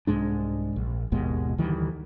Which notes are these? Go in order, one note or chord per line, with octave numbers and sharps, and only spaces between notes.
C2 G#2 G#3 D4
A#1
G#1 D#2 B2 G#3
D2 D#3 E3 G3